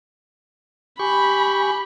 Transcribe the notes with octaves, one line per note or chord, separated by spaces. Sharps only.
G4 G#5 B5 C#6